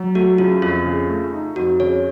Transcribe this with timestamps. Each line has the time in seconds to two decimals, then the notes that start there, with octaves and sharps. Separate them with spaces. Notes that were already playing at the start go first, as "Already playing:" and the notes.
Already playing: F#3
0.15 A3 F#4
0.38 C#3 F4
0.62 F2 F4
0.86 C#3
1.10 A3
1.33 D#4
1.56 F2 F#4
1.80 C#3 C#5